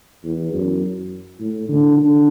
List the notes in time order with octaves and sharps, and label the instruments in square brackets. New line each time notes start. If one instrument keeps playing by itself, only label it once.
[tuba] E2
F#2
A2
D3
D3